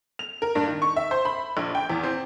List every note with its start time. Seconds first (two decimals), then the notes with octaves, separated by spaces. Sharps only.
0.19 F7
0.42 A#4
0.55 G2
0.68 D#3
0.82 C#6
0.96 E5
1.11 C5
1.25 B5
1.57 A#1
1.75 G5
1.90 E2
2.03 C4